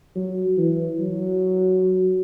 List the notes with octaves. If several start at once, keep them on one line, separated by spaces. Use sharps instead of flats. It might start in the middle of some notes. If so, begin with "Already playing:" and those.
F#3
E3
F#3